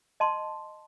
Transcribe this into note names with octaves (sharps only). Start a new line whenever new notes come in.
D#5 A5 C6